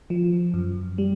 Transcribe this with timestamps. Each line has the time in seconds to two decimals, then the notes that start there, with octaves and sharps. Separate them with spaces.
0.10 F3
0.54 F#2
0.98 G3